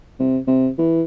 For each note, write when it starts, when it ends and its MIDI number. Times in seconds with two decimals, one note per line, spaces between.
0.19 0.38 48
0.47 0.68 48
0.78 1.02 52